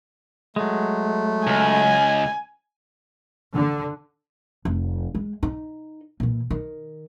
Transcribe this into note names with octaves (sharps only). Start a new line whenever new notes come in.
F#3 G#3 A3
C#2 G#5
D3
F1
G#3
D#4
A#2 E3
D#3